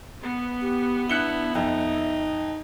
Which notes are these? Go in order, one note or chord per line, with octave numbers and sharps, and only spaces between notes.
B3
G4
D4 E4 F#6 C#7 G7
F2 D#4 E5